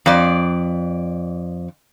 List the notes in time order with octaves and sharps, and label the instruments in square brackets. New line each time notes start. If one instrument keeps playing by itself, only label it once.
[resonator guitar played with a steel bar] F2 D5